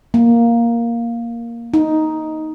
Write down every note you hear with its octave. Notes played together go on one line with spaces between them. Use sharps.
A#3
D#4